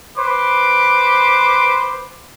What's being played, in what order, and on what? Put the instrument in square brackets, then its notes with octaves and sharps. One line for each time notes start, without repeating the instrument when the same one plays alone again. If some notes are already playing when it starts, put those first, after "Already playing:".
[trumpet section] B4 C5 D6